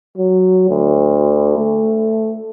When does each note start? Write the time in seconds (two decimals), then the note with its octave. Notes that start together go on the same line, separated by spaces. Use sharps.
0.18 F#3
0.69 D2
1.57 A3